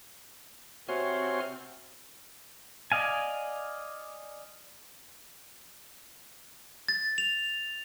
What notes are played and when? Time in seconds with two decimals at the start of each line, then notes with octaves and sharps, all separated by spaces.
0.88 C3 C4 F#4 C#5 G#5 C6 F6
2.92 D5 D#5 F5 G#5
6.88 A6
7.18 F7